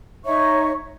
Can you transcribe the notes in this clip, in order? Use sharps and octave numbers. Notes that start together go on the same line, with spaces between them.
D#4 C#5 E5 C#6